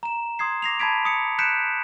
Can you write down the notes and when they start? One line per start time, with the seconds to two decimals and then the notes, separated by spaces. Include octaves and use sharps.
0.03 A#5 E7
0.39 C6 D#6 G#6 C7
0.62 D6 A#6 C7 F7
0.79 A5 B5 G#6 B6 D7
1.05 D#6 C#7
1.39 F#6 G6 B6 C#7 D7 E7